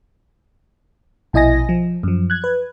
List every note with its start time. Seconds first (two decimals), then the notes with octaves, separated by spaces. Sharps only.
1.33 A#1 B2 E4 D#5 G#5 A#6
1.69 F3
2.03 F#2 F3
2.30 F#6 G#6
2.44 B4